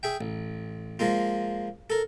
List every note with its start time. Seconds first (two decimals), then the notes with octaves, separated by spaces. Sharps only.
0.03 G#4 E5 G5
0.21 A1
0.99 F3 G#3 A#3 F4
1.90 A4 A#4